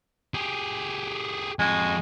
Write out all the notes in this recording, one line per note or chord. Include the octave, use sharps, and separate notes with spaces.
G4 G#4
F2 G#3 F#4